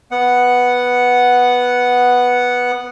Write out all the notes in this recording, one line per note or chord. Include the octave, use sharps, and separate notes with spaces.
B3 F#5